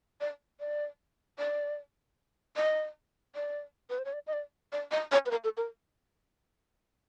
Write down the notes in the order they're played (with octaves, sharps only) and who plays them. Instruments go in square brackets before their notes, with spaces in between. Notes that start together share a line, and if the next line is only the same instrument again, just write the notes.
[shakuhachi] D5
D5
D5
D#5
D5
B4
C5
C#5
D5
D#5
D5
D5
D#5
C#5
B4
A#4
A4
A#4